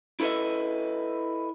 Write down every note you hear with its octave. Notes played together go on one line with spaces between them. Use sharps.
E4 A4 B4 D#5 E5